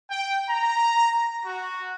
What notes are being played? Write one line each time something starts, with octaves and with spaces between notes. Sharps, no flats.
G5
A#5
F#4